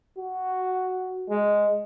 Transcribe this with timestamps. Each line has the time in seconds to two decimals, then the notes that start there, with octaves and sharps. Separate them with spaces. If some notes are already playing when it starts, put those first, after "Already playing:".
0.17 F#4
1.30 G#3